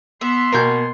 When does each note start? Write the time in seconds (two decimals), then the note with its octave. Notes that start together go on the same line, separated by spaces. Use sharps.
0.21 B3 E5 C6
0.52 B2 A#3 A#4 G#5 G6